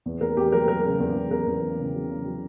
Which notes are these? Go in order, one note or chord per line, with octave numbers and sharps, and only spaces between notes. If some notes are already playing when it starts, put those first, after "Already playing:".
E2
E2 A#4
E2 G4
F#3 A#4
F#3 A#4
C#3
E2
E2
E2 A#4
E2
E2
C#3
F#3
C#3
F#3